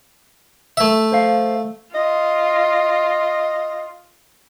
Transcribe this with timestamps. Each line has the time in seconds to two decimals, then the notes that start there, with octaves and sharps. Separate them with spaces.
0.77 A3 E5
1.12 C5 F5
1.95 F4 D#5